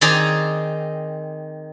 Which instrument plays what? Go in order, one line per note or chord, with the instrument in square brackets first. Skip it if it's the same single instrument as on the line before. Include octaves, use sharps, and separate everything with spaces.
[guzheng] D#3 C4 G#4 D5 A#5